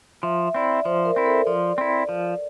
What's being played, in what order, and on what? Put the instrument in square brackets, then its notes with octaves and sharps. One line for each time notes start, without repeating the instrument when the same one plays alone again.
[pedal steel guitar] F3 [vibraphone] E5
[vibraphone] E5
[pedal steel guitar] C4 E4 [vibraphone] D5
[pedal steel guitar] F3 [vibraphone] C5
[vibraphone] A#4
[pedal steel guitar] C4 E4
[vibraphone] A4
[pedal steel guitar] F3 [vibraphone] D5
[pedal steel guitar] C4 E4
F3